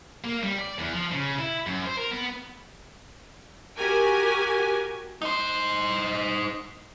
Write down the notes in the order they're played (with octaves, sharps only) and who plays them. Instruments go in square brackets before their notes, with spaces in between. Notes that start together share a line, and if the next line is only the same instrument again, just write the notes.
[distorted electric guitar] A#3
G3
D5
E2
F3
C#3
E4
F#2
C5
A#4
B3
[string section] F#4 G4 A#4 G#5
[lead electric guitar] D#4 C5